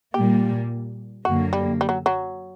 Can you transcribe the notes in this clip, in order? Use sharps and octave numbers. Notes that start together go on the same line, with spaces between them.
A#2 G3 A#3 G4
F#2 D3 A#3 F#4
G3
G3
F#3
F#3